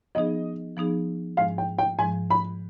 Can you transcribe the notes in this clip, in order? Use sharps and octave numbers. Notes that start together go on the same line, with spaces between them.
F3 B3 D#4 G#4 D#5
F3 B3 D#4 G#4
G#2 F3 G#3 F5
G5
G5
G#2 F3 G#3 G#5
B5